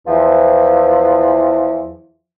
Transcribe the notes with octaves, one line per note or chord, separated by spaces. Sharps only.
E2 E3 F3